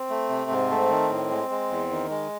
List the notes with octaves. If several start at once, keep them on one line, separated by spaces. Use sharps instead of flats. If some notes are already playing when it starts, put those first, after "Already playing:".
Already playing: C4
A3
C3
G#2
A3
D#3
A2
G#3
G#3
E2
D#3
G#3